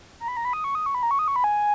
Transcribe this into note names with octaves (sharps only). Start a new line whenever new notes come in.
A#5
B5
A#5
B5
D#6
C#6
D#6
C#6
B5
A#5
C#6
D#6
C#6
B5
G#5